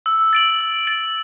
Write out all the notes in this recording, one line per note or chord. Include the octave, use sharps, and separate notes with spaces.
E6
A6 D7 F#7
E6
A6 D7 F#7